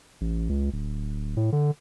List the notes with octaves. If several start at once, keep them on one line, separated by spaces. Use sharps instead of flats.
A1
C#2
D1
A2
D3